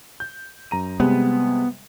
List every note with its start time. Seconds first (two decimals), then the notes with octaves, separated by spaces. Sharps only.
0.20 G6
0.71 F#2 A#5 D#7
1.00 C3 G3 G#3 B3